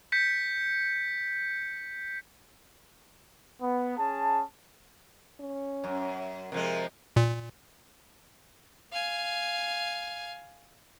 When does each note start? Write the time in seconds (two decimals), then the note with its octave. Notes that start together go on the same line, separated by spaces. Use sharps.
0.12 G6 B6 C#7
3.62 B3
3.98 C#4 G#4 A5
5.41 C#4
5.84 F#2
6.52 C3 F3 G#3 A#4
7.16 A#2
8.92 F5 G#5